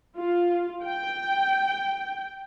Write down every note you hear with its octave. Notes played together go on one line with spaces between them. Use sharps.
F4
G5